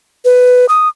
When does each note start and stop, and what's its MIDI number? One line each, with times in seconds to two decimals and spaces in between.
0.25 0.66 71
0.69 0.88 87